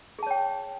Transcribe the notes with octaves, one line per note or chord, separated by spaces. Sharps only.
G#4 C#5 G5 A5